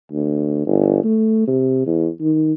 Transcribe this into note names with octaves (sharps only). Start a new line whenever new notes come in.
D2
G1
A3
C3
E2
D#3